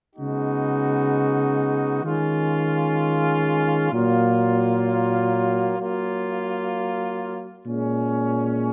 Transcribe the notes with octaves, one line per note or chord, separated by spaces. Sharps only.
C#3 G#3 B3 D#4 F#4
D#3 G#3 C#4 F4
A#2 F#3 A#3 F4
F#3 A#3 F4
A#2 G#3 C#4